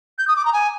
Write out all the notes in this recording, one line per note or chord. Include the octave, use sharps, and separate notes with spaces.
G6
D#6
D6
A#5
G#5